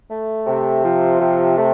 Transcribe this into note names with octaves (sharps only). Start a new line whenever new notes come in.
A3
C3
F3
C3
A3